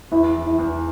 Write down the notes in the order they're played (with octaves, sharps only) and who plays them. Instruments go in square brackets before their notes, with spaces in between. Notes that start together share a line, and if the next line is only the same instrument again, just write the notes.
[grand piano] E2 [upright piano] E4
[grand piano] E3
[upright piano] E4
[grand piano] E2